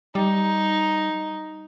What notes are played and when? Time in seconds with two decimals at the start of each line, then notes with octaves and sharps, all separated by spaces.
0.15 G3 D#4